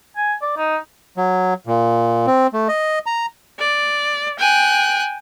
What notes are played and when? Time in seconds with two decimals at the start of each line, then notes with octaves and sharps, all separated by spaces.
0.17 G#5
0.42 D5
0.57 D#4
1.17 F#3
1.67 A#2
2.27 C4
2.53 A3
2.68 D#5
3.06 A#5
3.60 D5
4.39 G5 G#5 F#6